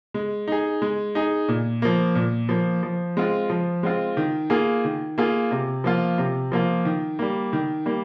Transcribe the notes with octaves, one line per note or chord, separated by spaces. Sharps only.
G#3
D#4 G#4
G#3
D#4 G#4
A#2
F3 A#3
A#2
F3 A#3
F3
G#3 C4 F4
F3
G#3 C4 F4
D#3
A#3 F4 G#4
D#3
A#3 F4 G#4
C3
F3 A#3 F4
C3
F3 A#3 F4
D#3
G3 A#3
D#3
G3 A#3